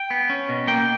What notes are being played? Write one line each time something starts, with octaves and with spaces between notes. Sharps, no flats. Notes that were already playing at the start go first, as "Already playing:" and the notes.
Already playing: G5
B3
C#4
B2
A#3 G5